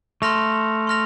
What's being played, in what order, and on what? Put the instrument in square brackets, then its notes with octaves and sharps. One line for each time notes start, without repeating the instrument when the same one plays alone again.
[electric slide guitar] A3 [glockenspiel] C6 F6 A#6 F7
[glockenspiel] C6 F6 A#6 F7